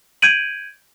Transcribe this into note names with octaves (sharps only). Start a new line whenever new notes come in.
G6 G#6 D7 D#7 F#7